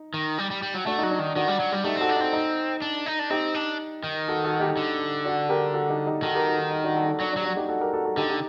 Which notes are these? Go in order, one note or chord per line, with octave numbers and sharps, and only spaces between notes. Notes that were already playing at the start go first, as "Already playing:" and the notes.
Already playing: D#4
D#3
G3
G3
G3
F#3
A3 D4 F#4
F#3 D#4
D4
D#3
D#3 D4 F#4
G3
F#3
G3
A3 D#4 G4
C4 F#4 A4
D4
C4 D#4
D#4
D4
D#4
D4
C4 D#4 G4
D4
D#3
F#4 A4
F#4 A4
D#4 G4
D3
D4 F#4
G4 A#4
F#4 A4
D#4 G4
D#4 G4
D#3 F#4 A4
G4 A#4
F#4 A4
D#4
D#4
D4 F#4
F#4 A4
D4 F#4
F#3 D4
D4
F#3 G4
D4 F#4
D#4 G4
F#4 A4
G4 A#4
F#4 A4
F#4 A4
D3 D#4 G4
D#4 G4